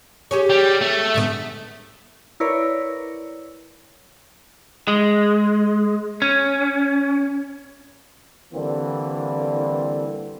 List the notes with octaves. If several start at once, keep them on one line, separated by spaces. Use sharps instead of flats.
G4 G#4 C#5
G3
A3
G#2 D3 B3
E4 A#4 B4 C#5 D5
G#3
C#4
D3 E3 G3 A#3 C4